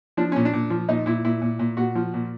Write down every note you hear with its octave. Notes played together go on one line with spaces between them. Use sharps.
F3 D4
A#2 C#4
D4
A#2
F3
A#2 D#4
A#2 E4
A#2 E4
A#2
A#2
A#2 F#4
F3
A#2